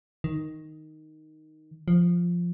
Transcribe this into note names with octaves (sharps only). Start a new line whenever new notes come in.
D#3
F3